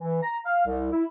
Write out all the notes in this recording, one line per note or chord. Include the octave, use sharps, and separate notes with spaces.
E3
A#5
F5
C2
E4